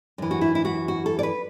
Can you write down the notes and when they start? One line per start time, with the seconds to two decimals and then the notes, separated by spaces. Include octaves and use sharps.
0.18 F#2 E3
0.31 F#4
0.41 E4
0.55 E4
0.65 F#4
0.88 F#4
1.06 A4
1.19 D5
1.23 B4